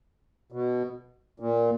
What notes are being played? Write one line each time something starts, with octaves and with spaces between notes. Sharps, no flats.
B2
A#2